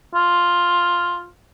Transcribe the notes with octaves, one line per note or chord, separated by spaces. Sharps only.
F4